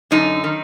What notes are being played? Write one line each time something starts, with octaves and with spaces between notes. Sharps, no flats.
F#2 D3 D#4
D#3